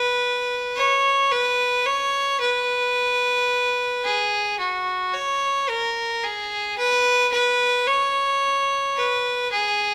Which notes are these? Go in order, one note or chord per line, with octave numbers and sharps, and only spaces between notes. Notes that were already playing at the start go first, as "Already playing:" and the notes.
Already playing: B4
C#5
B4
C#5
B4
G#4
F#4
C#5
A#4
G#4
B4
B4
C#5
B4
G#4